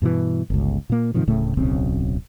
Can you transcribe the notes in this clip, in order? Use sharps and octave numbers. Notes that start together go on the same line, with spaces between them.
G2 B2 D#3 E3
G1 C#2
A#2 A#3
G#2 C3 D#3 F3
D1 A2 C#3 A3
D1 B1 C#3 C4